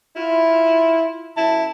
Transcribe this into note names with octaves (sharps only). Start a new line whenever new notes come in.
E4 F4
F#2 E4 A5